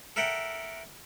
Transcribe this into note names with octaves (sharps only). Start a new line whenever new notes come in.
A4 A#4 E5 F#5 G5